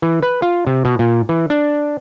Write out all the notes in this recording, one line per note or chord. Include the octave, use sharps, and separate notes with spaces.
E3
B4
F4
C3
B2
A#2
E3
D4